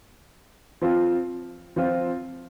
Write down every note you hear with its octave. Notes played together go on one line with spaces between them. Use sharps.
F3 C4 F4
F3 C4 F4